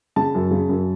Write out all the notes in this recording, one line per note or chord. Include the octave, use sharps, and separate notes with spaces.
C#3 A5
F#2
C#3
F#2